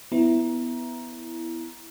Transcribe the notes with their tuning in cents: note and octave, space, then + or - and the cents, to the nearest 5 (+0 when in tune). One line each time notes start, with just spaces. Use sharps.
B3 +10 E4 +0 A#5 +15